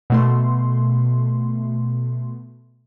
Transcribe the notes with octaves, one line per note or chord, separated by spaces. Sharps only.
B2 A3 C6